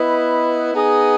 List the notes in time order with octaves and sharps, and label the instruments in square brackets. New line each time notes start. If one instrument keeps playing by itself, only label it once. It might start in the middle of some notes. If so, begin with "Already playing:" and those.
Already playing: [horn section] B3 E4 B4 D#5
B3 D#4 G#4 D#5